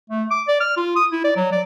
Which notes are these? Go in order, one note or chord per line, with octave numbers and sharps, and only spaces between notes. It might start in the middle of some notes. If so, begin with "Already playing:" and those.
A3
D6
D5
F6
F4
D#6
E4
D5
F#3
D5